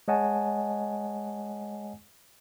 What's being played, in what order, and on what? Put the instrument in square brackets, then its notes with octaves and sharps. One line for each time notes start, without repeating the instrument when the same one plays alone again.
[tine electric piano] G#3 C#5 D#5 F#5 G#5 A5